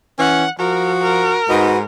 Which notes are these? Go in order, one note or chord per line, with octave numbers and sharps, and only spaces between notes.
E3 C#4 F#5
F3 F#4 A#4
A#4
G#2 D#4 F#4 B4